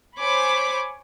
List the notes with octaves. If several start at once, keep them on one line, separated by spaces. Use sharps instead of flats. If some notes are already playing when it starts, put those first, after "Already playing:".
C5 C#5 G#5 B5 D6